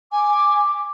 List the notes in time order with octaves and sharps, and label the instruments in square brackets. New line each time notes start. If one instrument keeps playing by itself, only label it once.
[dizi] G#5 [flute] D6